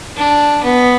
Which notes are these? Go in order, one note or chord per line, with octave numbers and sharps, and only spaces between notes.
D4
B3